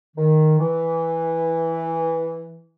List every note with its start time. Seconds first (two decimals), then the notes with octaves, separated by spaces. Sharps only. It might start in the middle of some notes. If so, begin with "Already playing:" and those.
0.17 D#3
0.59 E3